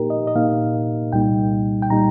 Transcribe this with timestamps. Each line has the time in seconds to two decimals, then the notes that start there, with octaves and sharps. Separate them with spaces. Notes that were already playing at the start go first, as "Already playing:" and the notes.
Already playing: A#2 A#3 D#4 G4 A#4
0.10 D#5
0.27 D#5
0.35 A#2 A#3 D#4 F5
1.13 C2 A#2 G3 D#4 G5
1.82 G5
1.90 A#2 G3 D#4 A#5